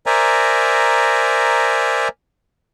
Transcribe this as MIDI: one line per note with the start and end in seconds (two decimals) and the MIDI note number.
0.06 2.08 70
0.06 2.08 72
0.06 2.08 74
0.06 2.08 76
0.06 2.08 80
0.06 2.08 82